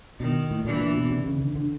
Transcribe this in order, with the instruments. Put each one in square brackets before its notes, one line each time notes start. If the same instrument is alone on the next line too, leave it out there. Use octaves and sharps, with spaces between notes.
[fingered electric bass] B2 [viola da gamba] D#3
[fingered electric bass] A2
[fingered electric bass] A#2 [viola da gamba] D3 E3
[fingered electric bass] A#2
B2
C3
C#3
D3
D3